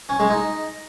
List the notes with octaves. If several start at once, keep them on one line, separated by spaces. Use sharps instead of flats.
C#4
G#3
D#4